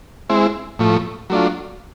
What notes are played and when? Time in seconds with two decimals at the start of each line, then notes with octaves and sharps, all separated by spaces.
0.30 G#3 C4 E4
0.79 A2 F3 A3
1.30 F#3 A3 D4 F4